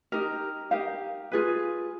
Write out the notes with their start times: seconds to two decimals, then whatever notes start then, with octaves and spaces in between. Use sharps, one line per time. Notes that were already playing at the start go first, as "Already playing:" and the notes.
0.12 D#4 G4 A#4
0.71 D#4 G4 A#4 F5
1.32 F4 G#4 B4